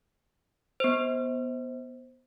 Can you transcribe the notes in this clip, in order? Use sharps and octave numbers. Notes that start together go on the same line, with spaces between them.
B3 C5